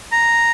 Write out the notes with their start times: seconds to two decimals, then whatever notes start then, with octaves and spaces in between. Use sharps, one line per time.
0.12 A#5